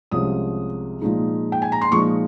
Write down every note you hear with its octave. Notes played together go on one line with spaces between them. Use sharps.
C2 C3 F3 G#3 C#4 D#6
A#2 F3 G#3 D#4
G5
G#5
A#5
C6
A#2 F3 G#3 D#4 C#6